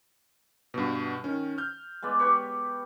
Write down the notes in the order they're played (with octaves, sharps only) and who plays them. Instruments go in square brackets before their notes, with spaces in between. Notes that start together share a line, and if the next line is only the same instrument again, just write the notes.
[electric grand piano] G2 B2
D#3 C#4
F6 G6
[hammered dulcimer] G#3 B3 D5
G4 B4 C#5